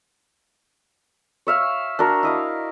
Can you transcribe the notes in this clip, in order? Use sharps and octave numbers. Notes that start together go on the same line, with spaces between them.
C#5 E5 F5
D4 F#4 A#4
E4 D#5 F5